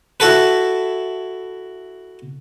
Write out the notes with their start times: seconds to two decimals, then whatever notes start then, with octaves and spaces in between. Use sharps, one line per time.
0.20 E4 F#4 A4 B4